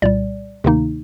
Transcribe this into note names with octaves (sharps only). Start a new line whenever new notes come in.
C2 A#2 G3 D5
D2 C3 D#3 A#3 D#4